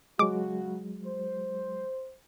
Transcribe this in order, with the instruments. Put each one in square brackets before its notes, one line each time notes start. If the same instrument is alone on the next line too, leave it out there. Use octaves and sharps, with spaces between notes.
[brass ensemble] C#3 F#4 [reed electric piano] F#3 G#3 [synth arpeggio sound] D6
[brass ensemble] C5